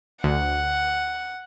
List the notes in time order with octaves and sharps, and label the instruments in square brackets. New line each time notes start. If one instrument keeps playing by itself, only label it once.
[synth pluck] D2 [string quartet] F#5